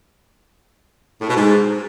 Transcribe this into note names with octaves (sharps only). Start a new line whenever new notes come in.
A2
B2
G#2